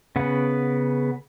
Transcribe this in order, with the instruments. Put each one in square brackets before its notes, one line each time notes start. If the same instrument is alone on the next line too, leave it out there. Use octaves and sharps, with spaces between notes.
[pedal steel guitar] C#3 B3 F#5